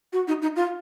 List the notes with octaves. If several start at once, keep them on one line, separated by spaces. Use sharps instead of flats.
F#4
D#4
D#4
F4